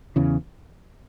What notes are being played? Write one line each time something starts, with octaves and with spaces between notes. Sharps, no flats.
E2 C#3 E3